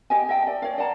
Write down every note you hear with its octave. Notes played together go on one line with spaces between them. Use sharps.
G4 D#5 G#5
D#5 E5 G5 A5
D5
C#5 F5
D5 F#5 A5 A#5